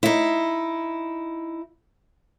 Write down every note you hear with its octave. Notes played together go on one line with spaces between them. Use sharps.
D#4 E4